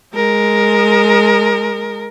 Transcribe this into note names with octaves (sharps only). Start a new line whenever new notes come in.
G#3 A#4